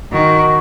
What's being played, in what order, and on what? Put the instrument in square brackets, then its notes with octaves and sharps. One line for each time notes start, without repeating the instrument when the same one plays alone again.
[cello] D#3 [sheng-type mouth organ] F#4